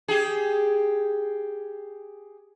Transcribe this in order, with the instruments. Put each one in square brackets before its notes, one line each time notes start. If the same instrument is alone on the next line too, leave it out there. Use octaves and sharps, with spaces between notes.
[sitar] G4 G#4